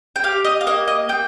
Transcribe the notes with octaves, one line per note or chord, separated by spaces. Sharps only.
G5
G4 F5
D#5
F5
A#3 D#5
D#5
A#3 G5